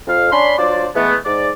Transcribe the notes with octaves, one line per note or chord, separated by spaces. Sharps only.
F2 F5
C#4 D4 B5 C6
F#3 D4 F4 C5 D5
E3 G#3 A3 B3
G#2 D5